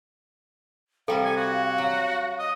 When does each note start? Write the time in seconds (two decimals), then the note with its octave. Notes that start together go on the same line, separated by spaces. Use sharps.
1.08 C3 G3 A4 F5 G5
1.25 G#5
1.37 F#4
1.78 F#3
2.39 D#5